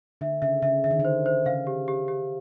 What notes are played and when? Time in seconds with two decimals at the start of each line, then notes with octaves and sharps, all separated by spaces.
0.21 D3 E5
0.42 C#3 E5
0.62 C#3 E5
0.84 D3 E5
0.91 D#3
0.99 D3
1.05 C5
1.26 C5
1.46 C#3 F5
1.67 G4
1.88 G4
2.08 G4